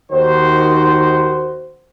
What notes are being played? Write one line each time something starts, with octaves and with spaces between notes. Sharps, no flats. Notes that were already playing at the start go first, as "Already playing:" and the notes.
D#2 D#3 F#4 C5